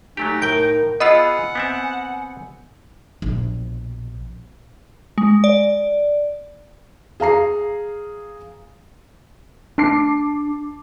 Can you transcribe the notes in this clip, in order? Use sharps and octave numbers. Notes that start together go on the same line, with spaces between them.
F#3 A3 D#4 G4 G#5
A2 A#4 G5 G6 D7
B3 F4 G#4 D#5 F#5 G#5 B5 E6
B3 C4 E5
A#1 B2
G#3
D5
G#4 F5 A#5 C7
D4 A5 D6 C7